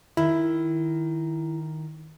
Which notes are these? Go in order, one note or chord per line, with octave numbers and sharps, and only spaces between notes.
D#3 E4